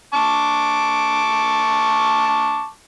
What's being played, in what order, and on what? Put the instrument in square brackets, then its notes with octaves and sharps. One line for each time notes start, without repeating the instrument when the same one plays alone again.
[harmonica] A5 C#6 D6